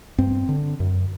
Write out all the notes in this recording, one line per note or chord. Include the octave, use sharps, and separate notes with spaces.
G2 C4
D3
F#2